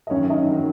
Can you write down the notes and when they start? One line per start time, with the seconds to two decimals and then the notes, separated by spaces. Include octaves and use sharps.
0.07 D#5
0.10 F#2 D#3 F#3 C#4 C#5
0.29 D#4 D#5
0.51 D#3 F#3